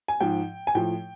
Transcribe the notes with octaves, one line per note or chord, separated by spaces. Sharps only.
G#5
G#2 F3 G5
G#5
A2 F3 G5